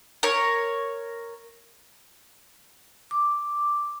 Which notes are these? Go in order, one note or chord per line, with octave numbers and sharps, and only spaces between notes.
A#4 C#5
D6